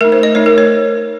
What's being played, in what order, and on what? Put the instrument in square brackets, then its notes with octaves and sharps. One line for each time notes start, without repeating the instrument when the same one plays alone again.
[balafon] A3 D#4 A#4
C5
D#5
A3 D#4 C#5
A#4
C#5